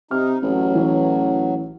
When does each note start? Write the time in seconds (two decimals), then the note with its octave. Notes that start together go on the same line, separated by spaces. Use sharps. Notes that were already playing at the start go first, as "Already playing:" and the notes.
0.11 C3 D#4 F6
0.42 A1 F#3
0.75 E3 C#5